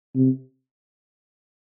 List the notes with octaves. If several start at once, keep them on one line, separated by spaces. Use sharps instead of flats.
C3